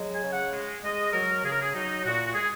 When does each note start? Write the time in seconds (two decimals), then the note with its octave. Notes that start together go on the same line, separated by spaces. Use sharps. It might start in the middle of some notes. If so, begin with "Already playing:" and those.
Already playing: F#3 G#3
0.13 G#5
0.23 C#3
0.33 F#5
0.53 G#3
0.83 G#3 D#5
1.13 F#3 A#4
1.43 C#3 G#4
1.51 A#4
1.60 G#4
1.73 F#3 D#4
2.04 A#2 F#4
2.26 F#4
2.34 G#3 G#4